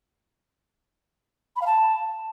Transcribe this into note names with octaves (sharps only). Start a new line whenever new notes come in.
B5
F5
A5